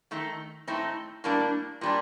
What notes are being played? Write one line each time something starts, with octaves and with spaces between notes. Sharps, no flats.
D#3 A3 D#4
A2 A3 C4 D#4
A2 G3 A#3 D4
A#2 G3 D4